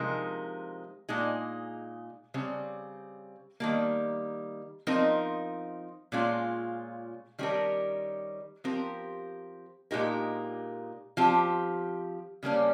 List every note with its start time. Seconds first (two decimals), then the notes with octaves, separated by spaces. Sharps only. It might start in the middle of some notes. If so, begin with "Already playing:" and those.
Already playing: C3 F3 G#3 D#4 A#4
1.09 A#2 G#3 D#4 G#4
2.34 C#3 G3 C4
3.60 D#3 G3 A#3
4.87 F3 C4 D#4 A#4
6.12 A#2 G#3 C#4 F4
7.38 D#3 G3 C#4 G4 A#4
8.64 F3 C4 G4 A#4
9.91 A#2 G#3 D#4 G4 A#4
11.17 F3 C4 G4
12.43 C#3 G3 A#3 C#4